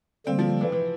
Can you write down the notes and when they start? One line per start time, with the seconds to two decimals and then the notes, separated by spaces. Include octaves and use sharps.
0.26 D3 G3 A#3 C4
0.39 F3
0.61 E3
0.72 E3